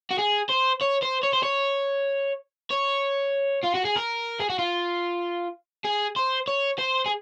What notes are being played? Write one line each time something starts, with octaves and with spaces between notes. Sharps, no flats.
F#4
G#4
C5
C#5
C5
C#5
C5
C#5
C#5
F4
F#4
G#4
A#4
G#4
F#4
F4
G#4
C5
C#5
C5
G#4